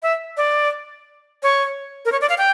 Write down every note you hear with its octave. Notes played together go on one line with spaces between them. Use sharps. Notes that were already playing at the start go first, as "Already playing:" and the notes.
E5
D5
C#5
A#4
C#5
D5
F5
G5